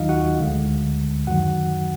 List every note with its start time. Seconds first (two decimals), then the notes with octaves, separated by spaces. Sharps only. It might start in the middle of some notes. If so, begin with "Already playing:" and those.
Already playing: D#2 D#3 F#3 D#4 F4 D#5 F5
0.09 F#4 F#5
0.39 D2 D3 G#3
1.27 F#2 D#3 F#3 F#4 F#5